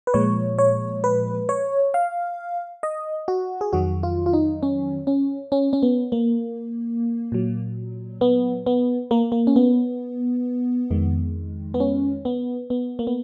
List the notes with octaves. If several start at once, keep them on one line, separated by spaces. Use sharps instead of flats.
B4
A#2 F3 G#3 C#5
C#5
B4
C#5
F5
D#5
F#4
G#4
F2 D#3 F#3 F#4
F4
F4
D#4
C#4
C#4
C#4
C#4
B3
A#3
A#2 F#3
B3
B3
A#3
A#3
C#4
B3
F2 D#3 G#3
B3
C#4
B3
B3
A#3
B3